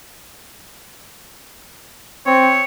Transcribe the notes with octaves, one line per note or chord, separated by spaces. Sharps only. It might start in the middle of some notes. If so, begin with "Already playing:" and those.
C4 C#5